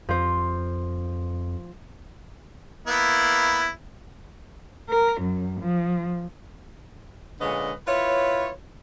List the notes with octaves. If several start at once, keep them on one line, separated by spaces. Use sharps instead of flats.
F2 F3 C5
A#3 B3 E4
A#4
F#2
F3
A#2 D3 G#3 C#4 B4 D#5
E4 F4 B4 C#5